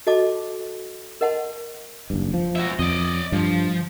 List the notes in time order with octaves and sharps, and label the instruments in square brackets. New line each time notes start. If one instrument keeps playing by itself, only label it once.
[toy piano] F#4 A4 D#5 A5 D6
A#4 D#5 F#5 A5 C6
[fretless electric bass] F#1 G2
F3
[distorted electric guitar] F#4 E5
[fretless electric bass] F2 [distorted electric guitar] D5 D#5
[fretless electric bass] G2 [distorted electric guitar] F3